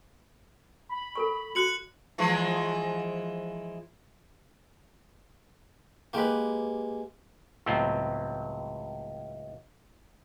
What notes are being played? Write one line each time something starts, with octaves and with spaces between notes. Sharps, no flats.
B5
A4 A#4 C#6
F#4 F#6 C#7 F#7
E3 F3 G#3
G#3 A#3 G4 B4
C#2 A2 F#3 B3 C4